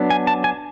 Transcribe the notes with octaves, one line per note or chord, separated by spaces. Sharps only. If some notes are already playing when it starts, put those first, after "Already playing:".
Already playing: F#3 B3 D4
G#5
A5
G#5